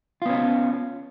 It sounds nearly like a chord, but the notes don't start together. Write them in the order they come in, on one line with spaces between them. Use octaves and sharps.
F4 B3 C#4